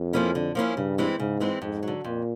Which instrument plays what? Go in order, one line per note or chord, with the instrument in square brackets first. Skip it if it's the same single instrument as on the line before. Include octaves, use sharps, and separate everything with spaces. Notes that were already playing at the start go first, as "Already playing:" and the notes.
Already playing: [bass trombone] F2
[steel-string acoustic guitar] F3 A#3 C#4 E4
D3
F3 A#3 C#4 E4
[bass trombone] G2 [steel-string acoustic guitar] C#3
[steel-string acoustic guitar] E3 G#3 C4 E4
[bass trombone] G#2 [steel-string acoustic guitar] C#3
[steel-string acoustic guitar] E3 G#3 C4 E4
[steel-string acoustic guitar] F2 [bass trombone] G#2
[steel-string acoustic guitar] D3 F#3
[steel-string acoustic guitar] F2 [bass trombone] A#2